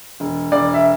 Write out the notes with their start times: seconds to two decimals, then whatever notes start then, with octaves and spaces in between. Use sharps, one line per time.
0.20 E1
0.52 E1 D5
0.74 E5